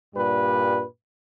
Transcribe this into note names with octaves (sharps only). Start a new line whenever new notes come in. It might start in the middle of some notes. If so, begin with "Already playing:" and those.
G2 A#2 G3 B4